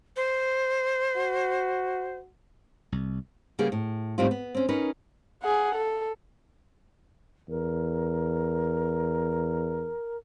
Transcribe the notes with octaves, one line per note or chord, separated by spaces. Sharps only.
C5
F#4
C2
C#3 G3 A#3 B3 C#4 G#4
A2
A2 D#3 G3 C4 F4
B3
C4 C#4
C#4 D#4 A#4 B4
G#4 F#5
A4
E2 A#4